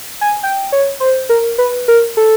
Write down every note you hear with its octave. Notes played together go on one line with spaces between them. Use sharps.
G#5
G5
C#5
C5
A#4
B4
A#4
A4